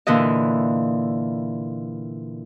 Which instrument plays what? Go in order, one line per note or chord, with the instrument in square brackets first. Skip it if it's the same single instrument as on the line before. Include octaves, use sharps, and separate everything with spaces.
[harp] A#2 D3 E3 E4 D#5